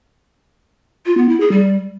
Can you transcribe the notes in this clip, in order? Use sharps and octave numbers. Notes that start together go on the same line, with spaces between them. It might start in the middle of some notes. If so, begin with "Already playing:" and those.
F4
B3
E4
G#4
G3